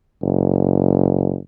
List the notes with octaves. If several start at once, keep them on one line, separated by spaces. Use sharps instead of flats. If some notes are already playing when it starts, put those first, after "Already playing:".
F#1